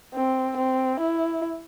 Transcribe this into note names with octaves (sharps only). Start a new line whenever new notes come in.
C4
C4
E4